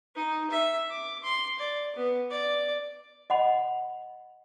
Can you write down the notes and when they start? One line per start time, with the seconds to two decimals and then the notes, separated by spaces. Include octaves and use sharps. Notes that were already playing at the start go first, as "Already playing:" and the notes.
0.15 D#4
0.50 E5
0.91 D6
1.24 C6
1.59 D5
1.96 B3
2.30 D5
3.30 D#5 F#5 B5